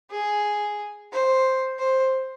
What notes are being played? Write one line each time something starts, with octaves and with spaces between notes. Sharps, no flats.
G#4
C5
C5